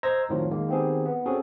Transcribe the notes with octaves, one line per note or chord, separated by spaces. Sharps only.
C5 D#5 A#5 E6 G#6 A#6
F2 A2 D#3 F3 F#3 F4
D#3 G#3 A#3
D#3 B3 C4 G4 G#4
B3
C4 C#4 F#4 G#4 A4